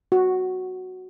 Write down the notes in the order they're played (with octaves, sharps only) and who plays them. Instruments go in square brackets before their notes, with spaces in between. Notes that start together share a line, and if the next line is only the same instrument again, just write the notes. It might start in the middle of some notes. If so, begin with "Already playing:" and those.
[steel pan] F#4